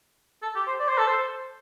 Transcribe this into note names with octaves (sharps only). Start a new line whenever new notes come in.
A4
G4
C5
D5
C5
A4
C5